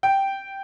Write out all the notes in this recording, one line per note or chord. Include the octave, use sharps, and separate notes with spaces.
G5